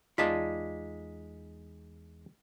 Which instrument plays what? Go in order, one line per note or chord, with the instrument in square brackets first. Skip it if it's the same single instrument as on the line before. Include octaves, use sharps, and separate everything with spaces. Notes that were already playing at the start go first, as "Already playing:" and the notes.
[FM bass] E2 [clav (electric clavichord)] G#3 D#4 [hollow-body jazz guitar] F4 D5 A5 [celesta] B6